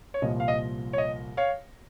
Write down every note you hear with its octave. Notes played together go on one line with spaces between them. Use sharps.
C#5
C2 A#2 F3 D#5
F5
D#5
C#5
D#5
C#5 F5